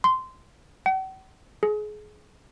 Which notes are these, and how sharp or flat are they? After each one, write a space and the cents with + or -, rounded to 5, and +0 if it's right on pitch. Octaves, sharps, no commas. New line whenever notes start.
C6 -15
F#5 +45
G#4 +25